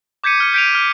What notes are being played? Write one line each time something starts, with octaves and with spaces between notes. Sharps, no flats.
D6 G6 G#6 B6 C#7 D#7
F6 C#7
G6 B6 D7 D#7 F7
F6